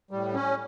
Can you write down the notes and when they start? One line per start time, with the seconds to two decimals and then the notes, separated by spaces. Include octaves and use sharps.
0.11 A2 G3
0.34 C#4